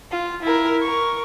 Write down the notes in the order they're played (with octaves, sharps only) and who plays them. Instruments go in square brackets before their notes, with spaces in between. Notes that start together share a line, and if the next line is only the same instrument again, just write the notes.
[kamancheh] F4
E4 A#4
A#4 C#6